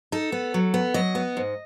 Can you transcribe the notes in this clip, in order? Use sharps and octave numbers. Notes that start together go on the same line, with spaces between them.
D#4 A4
B3
F#3
B3
F#3 D#5
B3
G#2